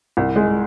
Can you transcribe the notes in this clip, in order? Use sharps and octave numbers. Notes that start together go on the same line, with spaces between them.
C2
G#3